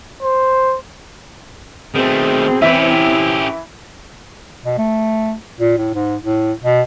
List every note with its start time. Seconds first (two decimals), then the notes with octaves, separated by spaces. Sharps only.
0.23 C5
1.95 B2 D#3 A3 C4 G#4
2.62 C3 E3 C#4 E4 G4 E5
4.65 B2
4.78 A3
5.60 A#2
5.78 A2
5.94 G#2
6.22 A2
6.64 B2